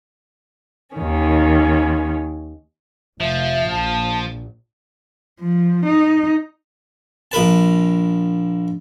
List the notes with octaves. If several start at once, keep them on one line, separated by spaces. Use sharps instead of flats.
D#2 D#3 C#4
F1 F3 E5
A#1 A5
F3
D#4
A#1 A#4 B4 A5